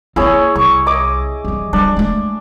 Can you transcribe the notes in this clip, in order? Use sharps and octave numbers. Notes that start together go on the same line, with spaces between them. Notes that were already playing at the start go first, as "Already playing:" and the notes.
A#3 C4 E4 G#4 C#5
C2 C#6
D#5 D6
G2 E3
F3 G3 D4
G#3 A3